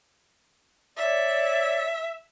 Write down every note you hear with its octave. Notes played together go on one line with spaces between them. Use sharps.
C#5 D5 E5